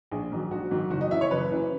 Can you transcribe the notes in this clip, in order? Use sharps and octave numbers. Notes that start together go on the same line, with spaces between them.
A#1 G#4
G#2 D#3 F#3
A#1 F#4
G#2 D#3 F#3
F#1 F#4
D#5
F#2 E3 E5
C#5
F#1 B4
F#2 E3